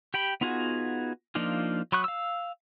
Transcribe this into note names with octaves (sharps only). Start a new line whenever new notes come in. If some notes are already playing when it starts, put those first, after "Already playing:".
G4 G5 B5
B3 D#4 F4 F#4 G#4
F3 A#3 D4 D#4 F4
F#3 B5 C#6 D#6 F#6
F5 E6